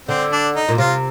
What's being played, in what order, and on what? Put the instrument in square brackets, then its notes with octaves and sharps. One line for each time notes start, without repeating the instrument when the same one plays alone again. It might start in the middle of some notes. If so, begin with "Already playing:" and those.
[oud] D3 [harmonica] C4
[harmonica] D4
D#4
[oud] A#2
[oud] C3 [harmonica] F4